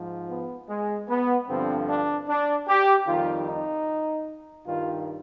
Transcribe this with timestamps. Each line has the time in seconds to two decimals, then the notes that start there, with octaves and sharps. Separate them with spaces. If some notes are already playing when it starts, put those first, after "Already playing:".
Already playing: G#2 F3
0.30 B3
0.69 G#3
1.09 B3
1.49 G2 D3 F3 C4
1.89 D4
2.28 D4
2.68 G4
3.07 F2 D#3 G3 F4
3.48 D#4
4.66 G2 D#3 G3 F4